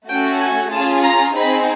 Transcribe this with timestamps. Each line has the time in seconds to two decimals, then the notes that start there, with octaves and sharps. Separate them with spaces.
0.08 A3 C#4 F#4 A4 G5
0.40 G#5
0.72 C#4 F4 G#4 A5
1.04 A#5
1.35 C4 D#4 G#4 B5